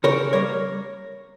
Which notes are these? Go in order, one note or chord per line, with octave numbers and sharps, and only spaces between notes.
C#3 A#4 C#5
G3 A#3 A#4 C#5